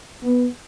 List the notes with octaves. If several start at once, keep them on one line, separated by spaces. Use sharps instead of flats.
B3